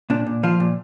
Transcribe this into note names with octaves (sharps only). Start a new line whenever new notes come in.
A#2 D4
A#2
F3 F4
A#2